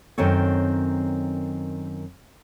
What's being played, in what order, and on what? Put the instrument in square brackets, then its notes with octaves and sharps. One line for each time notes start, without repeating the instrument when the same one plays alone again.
[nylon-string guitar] F#2 D#3 C4 A4 C#5